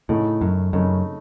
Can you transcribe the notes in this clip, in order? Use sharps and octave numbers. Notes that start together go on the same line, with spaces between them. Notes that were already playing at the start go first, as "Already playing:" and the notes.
A2 C#3 A3 D#4
F#2
F#2 C#3 A3 D#4